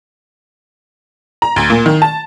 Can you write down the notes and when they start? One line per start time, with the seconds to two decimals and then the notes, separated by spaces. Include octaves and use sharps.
1.42 A#5
1.56 D2
1.70 A#2
1.86 D#3
2.02 A5